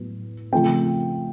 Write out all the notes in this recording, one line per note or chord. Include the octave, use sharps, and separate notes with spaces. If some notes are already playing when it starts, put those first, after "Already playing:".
Already playing: A2 F#3 B3
C#3 F3 A3 C4 G5